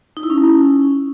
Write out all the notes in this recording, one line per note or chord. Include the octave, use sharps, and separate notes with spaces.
D#4
E4
C#4